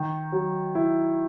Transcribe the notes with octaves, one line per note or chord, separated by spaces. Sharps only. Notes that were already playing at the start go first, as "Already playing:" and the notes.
Already playing: D#3
F#3
E4